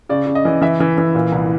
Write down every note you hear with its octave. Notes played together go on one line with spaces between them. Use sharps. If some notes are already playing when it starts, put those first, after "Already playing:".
C#3 D5
C#3
D#5
E3
E3 E5
E3
E3
A#2
C2